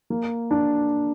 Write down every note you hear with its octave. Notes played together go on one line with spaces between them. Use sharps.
A#3
D4